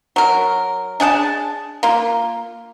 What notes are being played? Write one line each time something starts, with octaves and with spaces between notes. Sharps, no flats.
F#3 A#4
D4 G#4 F#5 A5
A#3 F4